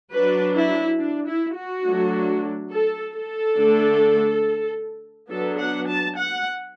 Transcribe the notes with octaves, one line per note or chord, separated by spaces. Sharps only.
F#3 D4 B4
E4
D4
E4
F#4
F#3 A3 D4
A4
A4
D3 A3 D4
F#3 B3 D4 A4
F#5
A5
F#5